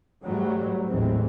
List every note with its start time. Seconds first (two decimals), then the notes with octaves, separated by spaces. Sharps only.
0.22 G#2 F#3 G3 A3
0.88 A1 D#2 A2 E3 G#3 C4